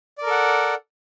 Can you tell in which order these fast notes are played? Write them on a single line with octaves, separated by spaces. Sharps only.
D5 A#4 A4 F#5